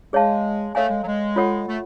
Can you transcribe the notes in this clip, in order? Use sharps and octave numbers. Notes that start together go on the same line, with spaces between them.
G#3 G#4 C#5 F5 A5
A3 A4 C#5 F5 G#5
G#3
F#3
G#3
F4 A4 C#5 F#5
A3